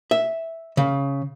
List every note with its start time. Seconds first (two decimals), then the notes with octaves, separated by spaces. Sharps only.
0.11 E5
0.77 C#3